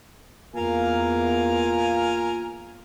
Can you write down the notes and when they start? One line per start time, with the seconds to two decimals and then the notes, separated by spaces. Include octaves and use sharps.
0.56 E2 A#3 F4 A#4 F5 G#5